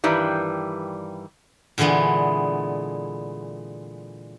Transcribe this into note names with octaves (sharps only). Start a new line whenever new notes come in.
G2 D#3 E3 G3
A#2 D3 E3 G#3 B3